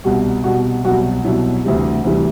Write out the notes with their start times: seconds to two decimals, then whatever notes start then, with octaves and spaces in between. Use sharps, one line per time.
0.04 C2 B2 G3 F#4
0.44 C2 B2 G3 F#4
0.84 C2 B2 F#3 F#4
1.24 C2 B2 F#3 E4
1.64 D2 C3 E3 G3
2.04 D2 C3 E3 G3